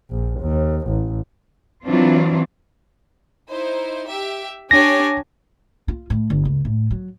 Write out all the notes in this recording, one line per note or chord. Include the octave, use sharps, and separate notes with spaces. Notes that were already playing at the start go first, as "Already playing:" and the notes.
A#1
D#2
A1
E3 F#3 C4 D4 F4
D#4 E4 C5
G4 E5
D4 G4 C#5 G#5 A#6
F4
A2
G1
C#2
A2
F#3